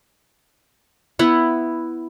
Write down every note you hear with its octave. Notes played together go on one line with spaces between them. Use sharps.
B3 E4 F#5